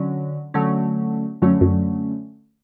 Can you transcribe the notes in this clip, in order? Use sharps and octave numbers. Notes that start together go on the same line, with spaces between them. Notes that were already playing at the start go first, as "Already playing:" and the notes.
Already playing: D3 F#3 C#4
D3 F#3 A3 C#4
F#2 D3 F#3 A3 C#4
F#2